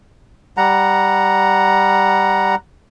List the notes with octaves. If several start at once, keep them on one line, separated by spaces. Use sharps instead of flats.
G3 F#5 A#5